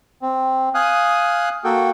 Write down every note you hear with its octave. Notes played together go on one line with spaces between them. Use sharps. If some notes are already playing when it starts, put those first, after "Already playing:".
C4
F5 G#5 D#6 F#6
A#3 F#4 A4 G5